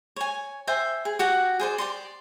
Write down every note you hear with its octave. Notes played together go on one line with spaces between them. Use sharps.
C#5 G#5
C5 E5 G5 G#5
G#4
F#4 G4 F#5
G#4 C5 D5
G4 D5 C6